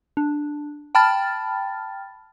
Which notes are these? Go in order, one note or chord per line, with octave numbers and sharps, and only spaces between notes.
D4
G5 A5 B5 F6 A6